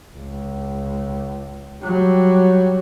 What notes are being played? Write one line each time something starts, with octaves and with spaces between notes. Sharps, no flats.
C#2
F#3 G3